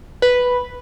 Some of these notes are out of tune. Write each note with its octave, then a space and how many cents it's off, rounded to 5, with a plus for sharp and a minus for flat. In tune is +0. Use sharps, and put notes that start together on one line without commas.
B4 +0